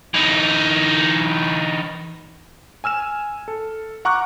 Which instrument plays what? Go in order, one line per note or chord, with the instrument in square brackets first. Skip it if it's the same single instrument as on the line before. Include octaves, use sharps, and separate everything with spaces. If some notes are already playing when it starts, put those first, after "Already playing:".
[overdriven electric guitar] E3 D#4
[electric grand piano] G#5 E6 F6 E7
A4
F#5 A#5 C#6 D6 F6 F#6